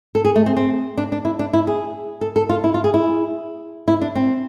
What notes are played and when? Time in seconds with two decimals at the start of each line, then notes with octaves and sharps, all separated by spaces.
0.15 A4
0.25 G#4
0.36 A3
0.46 C4
0.56 C4
0.98 D4
1.12 D4
1.25 E4
1.39 D4
1.53 E4
1.67 G#4
2.21 A4
2.36 A4
2.49 F4
2.64 E4
2.74 F4
2.84 G#4
2.94 E4
3.88 E4
4.01 D4
4.15 C4